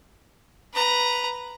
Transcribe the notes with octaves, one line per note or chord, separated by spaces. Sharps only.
B4 A#5